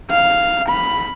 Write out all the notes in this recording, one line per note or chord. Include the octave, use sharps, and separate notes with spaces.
F5
B5